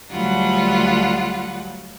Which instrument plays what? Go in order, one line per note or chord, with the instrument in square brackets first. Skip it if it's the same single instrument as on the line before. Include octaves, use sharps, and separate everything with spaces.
[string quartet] D2 F#3 G3 F4 F#5